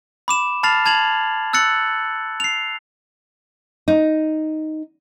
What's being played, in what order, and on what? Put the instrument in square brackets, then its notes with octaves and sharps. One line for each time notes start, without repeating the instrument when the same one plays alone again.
[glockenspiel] B5 D6 E7
A5 B5 F6 A6 C7 F7
A5 G#6 F7 F#7
E6 F#6 A6 C#7 F#7
C7 F7
[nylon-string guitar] D#4